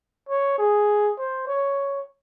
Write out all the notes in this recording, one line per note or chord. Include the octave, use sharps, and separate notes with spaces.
C#5
G#4
C5
C#5